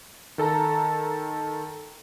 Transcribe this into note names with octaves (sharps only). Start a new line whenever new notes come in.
D#3 A4 A5 A#5